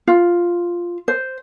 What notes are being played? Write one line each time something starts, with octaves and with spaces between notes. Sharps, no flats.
F4
C5